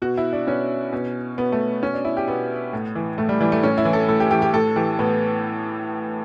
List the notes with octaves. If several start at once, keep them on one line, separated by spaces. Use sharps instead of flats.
B2 F#4
E4
D4
B2 C#4
B2
B2 B3
A3
B2 C#4
D4
E4
G4
B2 B3
A2
E3
A2 A3
G3
E3 G3
A3
A2 C#4
E4
E3
A4
A2 A4
G4
E3 G4
G4
A2 A4
E3 G4
A2 B3